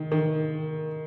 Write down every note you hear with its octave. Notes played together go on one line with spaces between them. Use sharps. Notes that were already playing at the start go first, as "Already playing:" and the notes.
Already playing: D#3
D#3